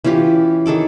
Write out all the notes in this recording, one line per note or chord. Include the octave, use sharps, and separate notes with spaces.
E3 C#4 F4 G4
D#3 G#4 A4 D6